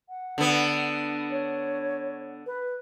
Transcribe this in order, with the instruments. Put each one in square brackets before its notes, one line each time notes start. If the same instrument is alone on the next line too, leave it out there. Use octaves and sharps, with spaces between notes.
[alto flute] F#5
[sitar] D3 B3
[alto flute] C#5
B4